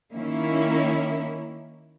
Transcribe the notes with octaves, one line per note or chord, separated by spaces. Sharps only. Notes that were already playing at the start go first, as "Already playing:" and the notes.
D#3 A#3 C#4 E4